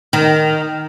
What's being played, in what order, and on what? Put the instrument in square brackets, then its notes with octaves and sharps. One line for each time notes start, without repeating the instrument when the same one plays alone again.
[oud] D#3